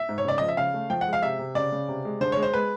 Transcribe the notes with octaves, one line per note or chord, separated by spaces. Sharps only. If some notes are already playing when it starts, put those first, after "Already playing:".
Already playing: E5
G#2
C#5
C#3 D5
F3 D#5
E5
C#3 F5
A3
F3 G5
F#5
G#3
F5
C3 E5
C3
C#3 D5
C#3
C3
G#3
D3 C5
G#3 C#5
C5
G#3 B4